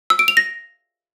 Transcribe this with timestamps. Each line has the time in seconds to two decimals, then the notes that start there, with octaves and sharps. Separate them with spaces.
0.10 E6
0.19 D7
0.28 F7
0.37 A#6